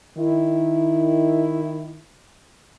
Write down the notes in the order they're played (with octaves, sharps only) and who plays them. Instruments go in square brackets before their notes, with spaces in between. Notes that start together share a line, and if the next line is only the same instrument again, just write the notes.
[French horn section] D#3 E4